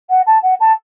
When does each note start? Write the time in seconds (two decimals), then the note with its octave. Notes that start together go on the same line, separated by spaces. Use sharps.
0.10 F#5
0.26 A5
0.43 F#5
0.60 A5